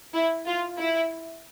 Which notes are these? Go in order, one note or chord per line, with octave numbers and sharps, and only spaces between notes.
E4
F4
E4